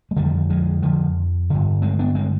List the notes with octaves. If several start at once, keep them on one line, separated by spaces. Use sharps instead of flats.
G#3
F2 D3 D#3 G3
F3 G#3
D3 F3
G2 D3
G#3 C4
B3 D4
G#3 C4